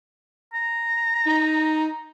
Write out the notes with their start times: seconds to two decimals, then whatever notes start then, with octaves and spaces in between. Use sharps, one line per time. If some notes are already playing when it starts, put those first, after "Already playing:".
0.54 A#5
1.27 D#4